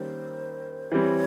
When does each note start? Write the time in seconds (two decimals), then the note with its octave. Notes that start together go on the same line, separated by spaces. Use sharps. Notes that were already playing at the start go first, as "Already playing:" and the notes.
Already playing: D#3 G3 A#3 C#4 C5
0.91 E3 G3 C4 C#5